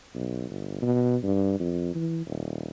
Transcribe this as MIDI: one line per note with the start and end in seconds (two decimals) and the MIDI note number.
0.15 0.48 35
0.49 0.77 31
0.82 1.16 47
1.23 1.59 43
1.60 1.95 41
1.95 2.25 52
2.26 2.69 27